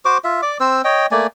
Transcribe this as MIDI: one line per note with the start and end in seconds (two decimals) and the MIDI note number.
0.05 0.18 66
0.05 0.18 72
0.05 0.18 86
0.24 0.41 65
0.24 0.41 76
0.42 0.58 74
0.42 0.58 86
0.60 0.82 60
0.60 0.82 72
0.60 0.82 88
0.84 1.07 73
0.84 1.07 75
0.84 1.07 79
1.11 1.27 57
1.11 1.27 58
1.11 1.27 74
1.11 1.27 80